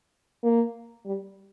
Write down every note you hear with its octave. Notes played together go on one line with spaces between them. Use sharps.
A#3
G3